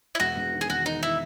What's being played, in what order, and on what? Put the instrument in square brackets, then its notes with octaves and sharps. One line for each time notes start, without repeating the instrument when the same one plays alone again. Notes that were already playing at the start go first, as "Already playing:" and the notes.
[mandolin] E4
[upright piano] E1 [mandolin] F#4
[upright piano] E1
D#3
[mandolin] G#4
[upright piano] E1 [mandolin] F#4
[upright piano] D#3 [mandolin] D#4
[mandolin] E4